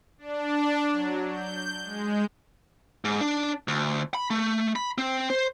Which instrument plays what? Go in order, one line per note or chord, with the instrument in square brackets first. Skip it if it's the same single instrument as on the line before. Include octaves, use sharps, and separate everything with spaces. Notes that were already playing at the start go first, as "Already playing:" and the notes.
[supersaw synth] D4
F#3
G6
G#3
[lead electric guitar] G#2
D4
D2
B5
A3
B5
C4
C5